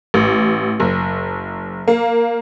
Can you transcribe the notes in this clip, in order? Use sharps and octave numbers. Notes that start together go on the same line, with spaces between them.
A1
F#1
A#3